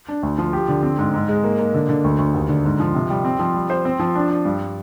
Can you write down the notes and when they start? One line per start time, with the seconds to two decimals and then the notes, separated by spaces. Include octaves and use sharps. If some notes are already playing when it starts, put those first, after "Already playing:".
0.09 D4
0.23 D2
0.38 F3
0.53 G4
0.68 D3
0.83 C4
0.98 G#2
1.14 G#2
1.28 G#3
1.44 A#3
1.59 A#3
1.74 D3
1.89 D3
2.04 D2
2.18 D2
2.34 D#2
2.49 D3
2.65 G#2
2.80 F3
2.95 C3
3.10 G3
3.25 C4
3.39 F3
3.54 G3
3.70 C5
3.85 C4
3.99 F3
4.15 D4
4.30 D4
4.45 G2